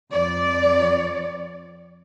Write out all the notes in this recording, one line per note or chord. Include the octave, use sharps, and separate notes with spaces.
F2 D5